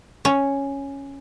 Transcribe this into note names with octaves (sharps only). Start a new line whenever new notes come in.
C#4